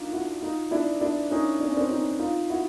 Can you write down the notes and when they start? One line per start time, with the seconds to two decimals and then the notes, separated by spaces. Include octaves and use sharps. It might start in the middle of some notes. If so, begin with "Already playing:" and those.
Already playing: D4 D#4 F4
0.13 E4 F#4
0.42 D#4 F4
0.71 D4 E4
1.01 D4 E4
1.31 C#4 D#4
1.60 D4
1.68 C#4
1.77 C4 D4
1.89 C#4 D#4
2.19 D#4 F4
2.49 E4 F#4